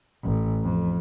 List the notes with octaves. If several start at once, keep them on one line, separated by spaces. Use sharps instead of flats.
A1
F2